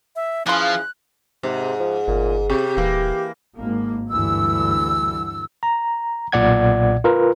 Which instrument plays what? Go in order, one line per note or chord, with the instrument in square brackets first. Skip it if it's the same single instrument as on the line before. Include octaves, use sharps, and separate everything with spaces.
[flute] E5
[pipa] E3 C6 [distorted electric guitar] F3 [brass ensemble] C#4 G#4 F5 [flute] F#6
[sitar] G#2 [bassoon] C3
[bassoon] F3
[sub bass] G1 [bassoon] A#2
[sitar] C3 [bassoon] G4
[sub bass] D#1 [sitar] E3 A#3
[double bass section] G#1 A#3
[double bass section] D2 G2 E3 [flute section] E6
[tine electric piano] A#5
B1 A#2 D5 F#5 G#6
F4 A#4 B4